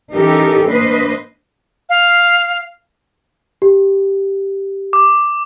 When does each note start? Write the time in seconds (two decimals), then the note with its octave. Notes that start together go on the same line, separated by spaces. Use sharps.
0.13 E3 C#4 D#4 G4 A4 A#4
0.69 A#3 D4 B4 C5 D#5
1.89 F5
3.62 G4
4.93 D6